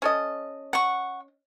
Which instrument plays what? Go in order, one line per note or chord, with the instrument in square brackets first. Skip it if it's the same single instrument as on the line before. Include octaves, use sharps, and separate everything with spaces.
[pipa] C#4 A4 D#5
[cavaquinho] F#5 C#6